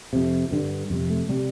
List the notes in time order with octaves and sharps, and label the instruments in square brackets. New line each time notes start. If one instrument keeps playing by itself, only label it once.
[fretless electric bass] F2 C3
G2 D3
F2 C3
A3
C3 G3